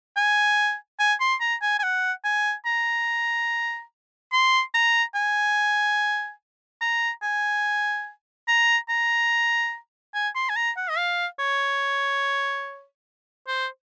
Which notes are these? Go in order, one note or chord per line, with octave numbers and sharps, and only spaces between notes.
G#5
G#5
C6
A#5
G#5
G#5
F#5
G#5
A#5
C6
A#5
G#5
A#5
G#5
A#5
A#5
G#5
C6
G#5
A#5
F#5
D#5
F5
C#5
C5